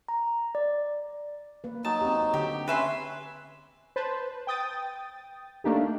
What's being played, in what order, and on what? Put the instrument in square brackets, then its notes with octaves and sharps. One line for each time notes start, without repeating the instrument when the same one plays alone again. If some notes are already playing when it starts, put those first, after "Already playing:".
[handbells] A#5
D5
[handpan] A#3 B4
[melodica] F#3 D#4 [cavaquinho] A5
[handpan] C4 G4
[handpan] D3 [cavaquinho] G4
[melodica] C#4 [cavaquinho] B4 E5 C6
[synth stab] B4 C5 A5
G5 D#6 A6
A3 A#3 D4 D#4 G4